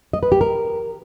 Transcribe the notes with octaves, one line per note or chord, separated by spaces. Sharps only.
D#5
B4
G4
A#4